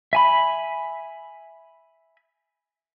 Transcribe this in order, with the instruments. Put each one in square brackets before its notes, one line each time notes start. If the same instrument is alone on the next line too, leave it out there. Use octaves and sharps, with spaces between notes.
[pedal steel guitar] E5 G#5 B5